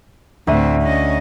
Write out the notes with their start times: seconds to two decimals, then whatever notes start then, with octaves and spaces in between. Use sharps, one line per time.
0.47 D2 A2 C4 E5 D#7
0.82 C#4 D#5